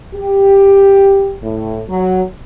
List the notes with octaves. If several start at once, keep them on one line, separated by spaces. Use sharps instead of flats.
G4
A2
F#3